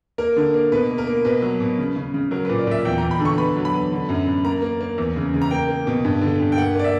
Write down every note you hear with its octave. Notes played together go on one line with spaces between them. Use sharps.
A#3 A#4
D3
A#3
B2 B4
A#3
A#4
A#3
B2 B4
F#3
B2
C#3
C#3
C#3
F#3 A#4
A#2 B4
D5
A#2 E5
E2 G5
E2 A#5
B5
D3
C#6
B3 B5
F#3
B5
B3
D3
F#2
F#2
A#3 A#5
A#3
A#3
E2
C#3
C#3
A#5
A#3 G5
A#3
B2
G2
D3
G2
G5
A#3 F#5
A#3 D5
E5